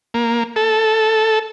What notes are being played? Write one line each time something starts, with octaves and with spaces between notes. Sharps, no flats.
A#3
A4